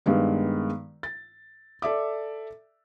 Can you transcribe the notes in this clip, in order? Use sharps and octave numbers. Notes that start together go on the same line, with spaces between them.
G2 D#3 G#3 B3
A6
A4 D5 E5 D6